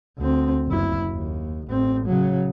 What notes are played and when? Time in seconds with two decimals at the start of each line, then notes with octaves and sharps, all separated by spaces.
0.18 D2 C4
0.67 F#1 E4
1.11 D#2
1.68 A1 C4
2.06 C#3 F#3